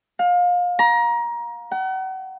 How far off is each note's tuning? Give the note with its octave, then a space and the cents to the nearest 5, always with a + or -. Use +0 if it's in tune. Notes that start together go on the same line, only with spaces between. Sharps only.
F5 +30
A#5 +25
F#5 +40